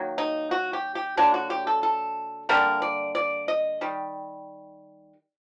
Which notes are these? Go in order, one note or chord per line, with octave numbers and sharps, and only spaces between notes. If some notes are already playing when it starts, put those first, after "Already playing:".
Already playing: D#3 F#3 A#3
D#4
F#4
G4
G4
D3 F#3 A#3 D4
F#4
G4
A4
A4
D3 G3 A#3 A#4
D5
D5
D#5
D#3 G3